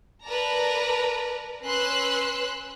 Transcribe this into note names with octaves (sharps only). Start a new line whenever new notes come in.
A#4 B4 D5 A5 A#5
C#4 B4 C6 E6 F#6